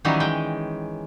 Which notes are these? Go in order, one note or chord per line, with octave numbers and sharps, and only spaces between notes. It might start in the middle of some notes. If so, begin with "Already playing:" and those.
D#3 E3 F#3 G3 C#4 D#4
G#3 G5